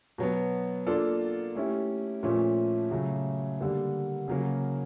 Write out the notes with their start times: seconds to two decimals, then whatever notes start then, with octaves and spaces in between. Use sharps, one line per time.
0.18 B2 F#3 B3
0.86 A#3 D4 F4 A4
1.55 A3 C#4 E4 G4
2.23 A#2 F3 A3 C#4
2.91 C#3 F#3 A3
3.60 D3 G3 A#3
4.28 C#3 F#3 A#3